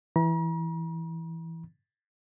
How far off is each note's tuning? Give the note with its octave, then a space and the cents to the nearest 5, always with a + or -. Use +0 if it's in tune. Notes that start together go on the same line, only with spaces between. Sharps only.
E3 +0 A#5 +45